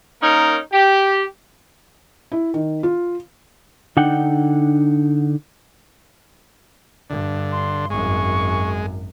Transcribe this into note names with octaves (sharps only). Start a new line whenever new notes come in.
A#3 C#4 D#4 A#4
G4
E4
D#3
F4
D3 D4 D#4 F#5 G5
G2 D3
C6
G#1 F#2 G#3 C#6